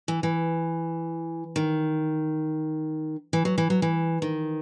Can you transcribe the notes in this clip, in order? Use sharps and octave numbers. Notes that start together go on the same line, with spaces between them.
E3
E3
D#3
E3
F#3
E3
F#3
E3
D#3